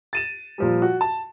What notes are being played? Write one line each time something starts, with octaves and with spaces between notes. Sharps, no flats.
A6 D#7 E7
A#2 F3 G3
F#4
A5